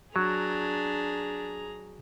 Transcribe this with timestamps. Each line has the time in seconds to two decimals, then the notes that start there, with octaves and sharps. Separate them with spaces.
0.16 F#3 D4 G#4 A#5